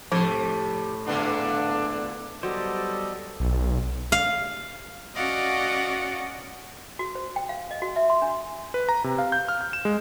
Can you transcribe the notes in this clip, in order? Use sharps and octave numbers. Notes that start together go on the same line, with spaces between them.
A2 C3 F3 G3
E2 A#2 D3 A3 B3 D4
F#3 G3 B3 G4 A4 C5 D5 D#5
B1
F5
C#4 F#4 D5 D#5 F5 F#5
F#4
C5
G5
F5
D#5
F#4
E5
C6
D4
B4
A#5
C3
F5
G6
F6
G6
E7
G#3